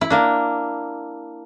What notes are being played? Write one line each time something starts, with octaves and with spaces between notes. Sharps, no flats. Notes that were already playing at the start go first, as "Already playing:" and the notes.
E4
A#3 D4